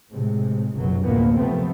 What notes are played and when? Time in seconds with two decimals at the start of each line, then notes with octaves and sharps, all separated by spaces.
0.13 A2 C3 G#3
0.74 F#1 C#2 F#2 B2 F#3
1.05 D2 A2 C3 F3 A#3 B3
1.37 F#2 C3 F3 A3 B3 C4